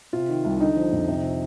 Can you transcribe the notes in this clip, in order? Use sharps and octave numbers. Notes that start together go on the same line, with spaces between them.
C3 F4
D#3
C2
D3 D#4
F3
F2
C3
F3